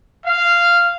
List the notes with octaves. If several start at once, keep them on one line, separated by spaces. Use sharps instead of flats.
F5